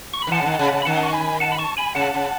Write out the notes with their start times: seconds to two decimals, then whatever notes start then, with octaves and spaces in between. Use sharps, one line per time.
0.14 C#6
0.22 B5
0.27 D#3
0.31 E3 F#5 A5
0.41 C#3
0.46 D#3
0.59 C#3
0.72 C#3
0.82 B5
0.85 D#3 F#5 A5
1.03 C#6
1.13 G#5 B5
1.40 F#5 A5
1.52 B5
1.59 A5 C#6
1.77 G#5 B5
1.95 C#3 F#5 A5
2.14 C#3